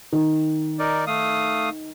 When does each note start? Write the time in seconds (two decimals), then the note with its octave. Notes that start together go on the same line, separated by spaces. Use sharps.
0.12 D#3
0.79 D#4 A#4 D5
1.07 A3 F5 D#6